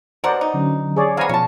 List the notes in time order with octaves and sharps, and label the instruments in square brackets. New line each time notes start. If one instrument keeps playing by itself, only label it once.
[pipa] B2 A#4 F#5 [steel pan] C5 D5 D#5
[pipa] D#4
[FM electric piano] D3 F#3 C#4
[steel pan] G#4 C#5 D5
[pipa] B3 C4 [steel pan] F5 G#5 A#5
[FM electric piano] B2 F3 [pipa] C#4 A5